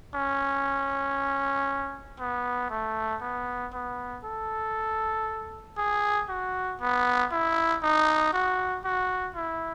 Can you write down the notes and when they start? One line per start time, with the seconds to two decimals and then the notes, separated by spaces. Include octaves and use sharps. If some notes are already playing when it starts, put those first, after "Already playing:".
0.15 C#4
2.19 B3
2.70 A3
3.21 B3
3.73 B3
4.24 A4
5.78 G#4
6.29 F#4
6.81 B3
7.32 E4
7.83 D#4
8.33 F#4
8.85 F#4
9.36 E4